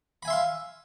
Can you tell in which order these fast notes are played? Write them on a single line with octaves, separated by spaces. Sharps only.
B5 G#5 E5 C6 F5